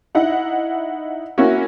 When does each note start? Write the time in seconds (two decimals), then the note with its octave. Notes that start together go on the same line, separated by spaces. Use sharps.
0.15 D#4 E4 F#5
1.38 A#3 C#4 E4 F#4